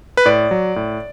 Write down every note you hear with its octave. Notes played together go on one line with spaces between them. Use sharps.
B4
A2 D5
F#3
A2